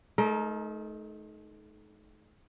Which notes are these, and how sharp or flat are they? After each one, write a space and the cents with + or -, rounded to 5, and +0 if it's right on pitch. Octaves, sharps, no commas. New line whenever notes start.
A3 -40 D#4 +5 A#4 +0